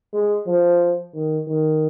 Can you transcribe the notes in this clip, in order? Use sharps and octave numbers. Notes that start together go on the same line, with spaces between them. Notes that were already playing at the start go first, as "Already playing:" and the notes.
G#3
F3
D#3
D#3